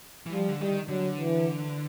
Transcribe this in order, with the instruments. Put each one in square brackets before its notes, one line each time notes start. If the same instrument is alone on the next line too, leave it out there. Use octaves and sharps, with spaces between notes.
[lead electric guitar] E3
[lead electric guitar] F3 [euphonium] G3
[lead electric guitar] D3
[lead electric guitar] D#3 [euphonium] G3
[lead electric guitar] D3 [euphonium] F#3
[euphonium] E3